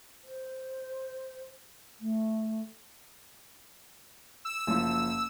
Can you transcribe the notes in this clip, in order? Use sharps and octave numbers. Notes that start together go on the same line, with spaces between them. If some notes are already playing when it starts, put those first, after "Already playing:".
C5
A3
E6
F#1 F3